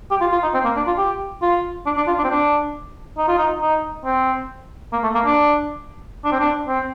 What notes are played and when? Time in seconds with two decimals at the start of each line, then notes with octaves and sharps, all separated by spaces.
0.11 G4
0.21 F4
0.32 F4
0.43 D#4
0.54 C4
0.64 A#3
0.76 D4
0.87 F4
0.98 G4
1.42 F4
1.86 D4
1.97 D4
2.07 F4
2.18 D4
2.24 C4
2.30 D4
3.18 D#4
3.28 F4
3.38 D#4
3.61 D#4
4.05 C4
4.93 A#3
5.03 A3
5.15 A#3
5.26 D4
6.24 D4
6.32 C4
6.40 D4
6.68 C4